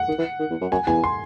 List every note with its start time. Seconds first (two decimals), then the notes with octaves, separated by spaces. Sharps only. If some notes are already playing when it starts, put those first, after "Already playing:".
Already playing: F#5
0.08 D#3
0.18 E3
0.39 D#3
0.50 E2
0.61 F#2
0.72 F#2 G#5
0.87 E2 G#5
1.04 C6